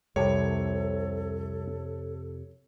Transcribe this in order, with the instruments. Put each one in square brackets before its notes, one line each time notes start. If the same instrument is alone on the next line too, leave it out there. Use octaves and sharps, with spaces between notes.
[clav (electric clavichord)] C2 G4 A5 [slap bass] F2 C3 [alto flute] A4 [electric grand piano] C#5